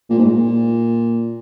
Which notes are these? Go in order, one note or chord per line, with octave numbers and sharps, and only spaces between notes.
A#2
G#2
A#2